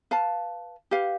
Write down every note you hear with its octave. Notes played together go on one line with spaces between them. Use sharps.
B4 F5 A5
G4 B4 F5